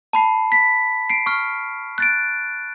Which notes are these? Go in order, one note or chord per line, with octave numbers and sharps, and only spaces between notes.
A5 B5 C7
B6
C7 D7
C#6 F6
F#6 A6 D7